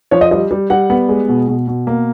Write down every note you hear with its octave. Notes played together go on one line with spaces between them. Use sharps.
F3 C#5
D#5
G3 D#5
G3
G3 F#5
B3
G#3
B2
B2
B2
A#3